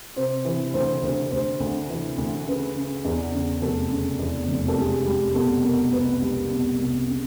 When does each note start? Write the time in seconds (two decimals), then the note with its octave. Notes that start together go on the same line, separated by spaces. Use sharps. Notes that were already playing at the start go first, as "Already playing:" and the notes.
0.16 C3 C5
0.45 E3
0.74 D2 C5
1.02 D2 C5
1.31 D2 C5
1.60 D2
1.90 E3
2.18 D2
2.46 C#3 B4
2.76 C#3
3.05 E2
3.34 C#3
3.62 F1 A4
3.91 C#3
4.19 E2
4.49 F1
4.68 A4
4.78 G3 G#4
5.05 G3
5.35 B2 A4
5.63 B2 A#4
5.92 C2 B4
6.21 G3
6.50 B2
6.79 C2
7.07 C#3